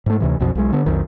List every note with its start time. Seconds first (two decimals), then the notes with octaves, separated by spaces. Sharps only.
0.06 G#2 A3
0.20 D2 C3 E3
0.40 B1 F2 B2 F3
0.55 B1 G#3
0.73 D3 B3
0.86 B1 F2 D#3